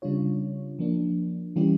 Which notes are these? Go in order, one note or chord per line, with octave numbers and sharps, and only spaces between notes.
C#3 G3 D4 F4 C#5
F3 A#3 D4
E3 G3 C#4 E4 G4